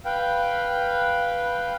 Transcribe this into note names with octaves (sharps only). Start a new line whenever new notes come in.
B4 F5 G5